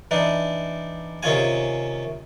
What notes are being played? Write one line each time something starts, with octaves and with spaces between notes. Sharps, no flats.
E3 D4 D#4
C3 D#3 C#4 F4 G#5